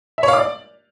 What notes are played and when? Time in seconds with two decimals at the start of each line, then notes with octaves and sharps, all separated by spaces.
0.18 E5
0.23 C#5
0.28 F5
0.33 D6
0.38 D5